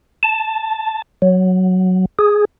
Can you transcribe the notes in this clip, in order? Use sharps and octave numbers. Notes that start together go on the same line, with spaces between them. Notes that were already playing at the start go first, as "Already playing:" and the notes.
A5
F#3
G#4